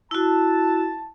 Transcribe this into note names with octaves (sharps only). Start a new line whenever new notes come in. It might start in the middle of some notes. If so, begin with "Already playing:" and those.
E4 F#4 A5